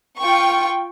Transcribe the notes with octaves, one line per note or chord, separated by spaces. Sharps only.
F4 G5 C#6